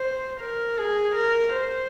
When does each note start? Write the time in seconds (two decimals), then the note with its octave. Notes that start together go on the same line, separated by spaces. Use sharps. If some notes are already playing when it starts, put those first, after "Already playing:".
Already playing: C5
0.41 A#4
0.78 G#4
1.15 A#4
1.53 C5